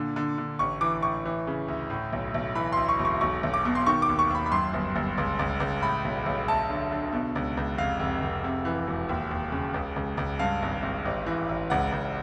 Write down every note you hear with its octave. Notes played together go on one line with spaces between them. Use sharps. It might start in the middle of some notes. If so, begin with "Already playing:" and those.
Already playing: A#2 D3
D3
D3
A1 C#6
E3 D6
A2 C#6
E3
C#3
D2
A2
B1
B1
E3 B5
D2 C6
C#6
E1
C#6
B1 C#6
B1
D6
B2
C6
D#3 C#6
D6
D#2
C#6
D#2 B5
B5
F#2 C6
G1
G1
C#2
C#2
C#2
A2 B5
B1
B1
D2 A5
D3
D3
B2
C#2
C#2
F1 F5
F1
F1
C3
E3
E1
D#2
D#2
C#3
C#2
C#2
C#2
G2 F5
G#1
G#1
A1
E3
A1
C#2 F#5
C#2